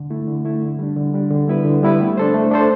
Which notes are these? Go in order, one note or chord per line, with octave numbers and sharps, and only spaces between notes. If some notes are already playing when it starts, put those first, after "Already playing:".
Already playing: D3
A3 E4
D3
A3 E4
D3
G3 D4
D3
G3 D4
D3
G3 B3 E4 B4
D3
G3 B3 E4 B4
A3
D4 A4 C5
A3
D4 A4 C5